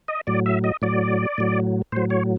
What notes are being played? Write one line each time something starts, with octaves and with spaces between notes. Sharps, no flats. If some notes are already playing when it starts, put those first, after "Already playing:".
D#5
A2 F#3 D5
E5
D#5
A2 F#3 D5
A2 F#3
A2 F#3 C5
C#5